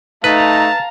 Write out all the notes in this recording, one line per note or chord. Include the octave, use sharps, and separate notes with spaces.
A3 D#4 B4 F5 A5 A#5